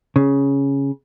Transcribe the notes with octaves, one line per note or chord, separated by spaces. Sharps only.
C#3